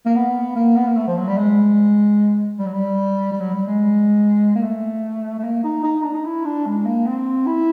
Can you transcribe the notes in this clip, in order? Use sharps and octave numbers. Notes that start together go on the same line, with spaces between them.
A#3
B3
A#3
B3
A#3
A3
F3
F#3
G3
G#3
G3
F#3
G3
G3
F#3
G3
G#3
A#3
A3
A3
A#3
D#4
D#4
D4
D#4
E4
D4
G#3
A#3
C4
E4